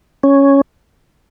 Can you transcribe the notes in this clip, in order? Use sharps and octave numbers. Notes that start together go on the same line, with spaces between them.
C#4